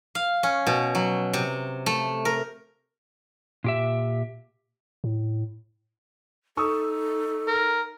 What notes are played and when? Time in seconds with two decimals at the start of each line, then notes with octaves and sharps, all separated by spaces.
0.15 F5
0.43 C#4
0.67 B2
0.95 F#3
1.33 C3
1.86 A3
2.25 A#4
3.64 A#2 G4 E5
5.04 A2
6.57 D#4 A4 C#6 D#6 E6
7.47 A#4